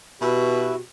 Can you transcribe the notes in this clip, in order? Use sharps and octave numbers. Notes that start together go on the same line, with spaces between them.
B2 E4 F#4 G4 B4 E5